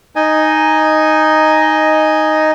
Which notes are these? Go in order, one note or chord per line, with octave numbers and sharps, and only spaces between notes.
D#4 D#5 G#5